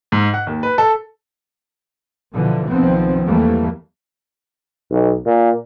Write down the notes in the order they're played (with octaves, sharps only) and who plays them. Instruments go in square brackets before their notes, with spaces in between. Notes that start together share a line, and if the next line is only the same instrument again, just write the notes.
[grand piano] G#2
F#5
D#2
B4
A4
[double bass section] B2 D3 E3 F3
B1 D#3 F3 B3 C4
E2 E3 G3 A3 A#3
[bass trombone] B1
A#2